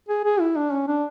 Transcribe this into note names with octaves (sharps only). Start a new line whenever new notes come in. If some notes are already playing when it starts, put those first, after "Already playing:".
G#4
G#4
E4
D4
C#4
D4